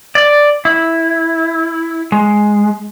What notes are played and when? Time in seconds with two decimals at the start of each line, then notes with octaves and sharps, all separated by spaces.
0.15 D5
0.65 E4
2.12 G#3